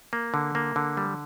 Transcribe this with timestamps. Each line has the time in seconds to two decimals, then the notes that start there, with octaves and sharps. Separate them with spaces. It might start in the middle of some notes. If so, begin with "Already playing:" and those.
0.13 A#3
0.34 D3
0.55 A#3
0.76 D3
0.97 G3